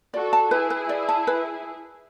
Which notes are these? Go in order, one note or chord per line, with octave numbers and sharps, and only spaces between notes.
F#4 A4 D5
A5
E4 G#4 B4
B4
D5
A5
B4